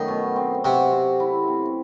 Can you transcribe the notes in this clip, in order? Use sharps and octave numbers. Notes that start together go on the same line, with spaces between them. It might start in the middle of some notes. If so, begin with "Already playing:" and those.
Already playing: F#2 D#3 A3 B3
B2
C4
C3 F#4
C4
E4
C4